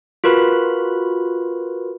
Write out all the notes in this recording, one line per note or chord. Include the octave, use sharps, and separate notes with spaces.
F4 F#4 A#4 B4 B5